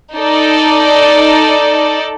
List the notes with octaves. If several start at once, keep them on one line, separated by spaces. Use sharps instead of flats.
D#4 A4 D5